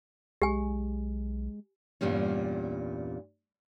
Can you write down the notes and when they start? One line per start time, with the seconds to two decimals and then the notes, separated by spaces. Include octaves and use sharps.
0.42 B1 G#3 G4 G#5
2.01 E2 G2 A#2 G3 C#4